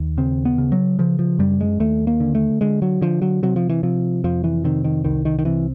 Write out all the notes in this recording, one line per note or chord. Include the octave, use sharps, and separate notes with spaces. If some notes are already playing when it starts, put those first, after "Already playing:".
Already playing: D#2
C#3 C4
B3
C#3
F#3
C#3 F3
F3
F#2 G3
G#3
D#2 A3
A#3
D3
A3
D3 G#3
F#3
D3 F3
F#3
C3 F#3
F3
E3
C3 F3
F2 F3
E3
C3 D#3
D#3
C2 D#3
D#3
D#3
C3 E3